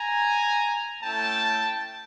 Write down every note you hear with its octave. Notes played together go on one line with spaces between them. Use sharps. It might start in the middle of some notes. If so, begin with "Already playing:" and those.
Already playing: G#5 A#5
A3 C#4 E4 G5 A5